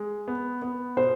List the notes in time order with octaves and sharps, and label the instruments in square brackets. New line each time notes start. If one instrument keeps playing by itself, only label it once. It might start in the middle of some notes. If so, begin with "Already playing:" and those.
Already playing: [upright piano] G#3
B3
B3
[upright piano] B2 [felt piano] C5